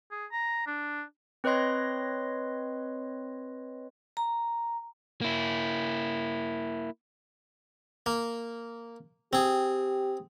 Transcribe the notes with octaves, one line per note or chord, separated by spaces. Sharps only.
G#4
A#5
D4
C4 B4 C#5 D#5 C6 A#6
A#5
A#3 E4
A#3
C4 G4 G#4